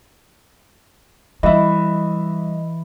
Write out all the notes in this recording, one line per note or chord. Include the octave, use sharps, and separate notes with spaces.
E3 G3 E4 D#5 E5